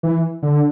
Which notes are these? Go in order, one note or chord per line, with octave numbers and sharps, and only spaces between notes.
E3
D3